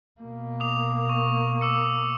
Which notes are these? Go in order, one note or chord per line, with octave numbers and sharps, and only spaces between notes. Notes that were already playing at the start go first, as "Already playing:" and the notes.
B2 A#3
D6 D#6 F7
C#6
D6 E6 C#7